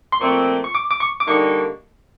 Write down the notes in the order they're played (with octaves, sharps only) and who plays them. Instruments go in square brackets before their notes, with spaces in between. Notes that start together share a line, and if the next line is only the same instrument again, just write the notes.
[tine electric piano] C6
[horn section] A#2 F3 A3 C4 [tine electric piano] C#6
[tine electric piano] C#6
D6
D6
C#6
D6
[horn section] D3 G3 A#3 D#4 [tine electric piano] C#6